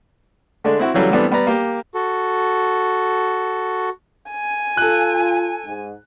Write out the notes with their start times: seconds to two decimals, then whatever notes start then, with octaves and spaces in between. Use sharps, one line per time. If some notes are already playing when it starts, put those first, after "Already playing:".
0.64 D3 G#3 A3 D4
0.79 C4 E4 F#4
0.94 C#3 E3 F#3 G3 A3
1.11 E3 G3 A3 B3 C4 D4
1.31 G3 B3 B4 D5 A#5
1.47 A#3 G4
1.94 F#4 A4
4.31 G#5
4.77 F4 A4 F#6
5.64 G#2